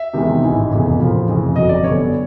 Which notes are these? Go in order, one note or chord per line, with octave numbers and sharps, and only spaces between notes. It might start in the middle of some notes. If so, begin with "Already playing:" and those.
Already playing: E5
E2 C3 D#3 G#3
A1 G#2 E3 G#3
F1 E2 C#3
A#1 A2 F3 A#3
F1 F2 C#3 E3
G1 F2 D3 F#3 D#5
D5
F#2 D3 G3 B3 C#5